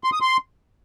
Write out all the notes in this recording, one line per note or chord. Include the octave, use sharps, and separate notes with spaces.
C6
D#6
C6